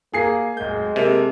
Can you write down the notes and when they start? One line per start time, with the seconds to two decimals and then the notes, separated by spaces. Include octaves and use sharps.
0.14 A#3 G#4 C7
0.57 D1 G#3 G6
0.96 C3 A#3 A4